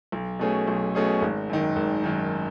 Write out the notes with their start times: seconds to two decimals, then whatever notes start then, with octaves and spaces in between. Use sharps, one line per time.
0.12 B1
0.39 B2 A3 C#4 G#4
0.67 B1
0.95 B2 A3 C#4 G#4
1.22 G#1
1.50 F#2 D#3
1.76 G#1
2.04 F#2 D#3